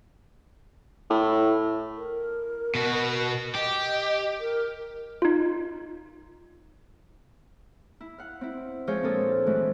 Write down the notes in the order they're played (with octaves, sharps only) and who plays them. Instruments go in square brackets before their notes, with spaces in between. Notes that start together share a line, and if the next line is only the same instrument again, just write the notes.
[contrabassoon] A2
[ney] A#4
[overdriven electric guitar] B2 F#4
[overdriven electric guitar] G4 [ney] D#5
[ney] A#4
[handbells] D#4 F4
[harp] E4
F5 F#5
C4 E4
F3 G#3 G#4 C5 C#5 F5
A#2 C4 D4 F4 A4 D#6
E3 F#3 G#3 A3